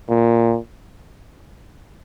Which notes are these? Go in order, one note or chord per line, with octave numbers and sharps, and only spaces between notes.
A#2